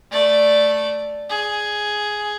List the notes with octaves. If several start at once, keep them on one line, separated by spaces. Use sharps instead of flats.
A3 D5
G#4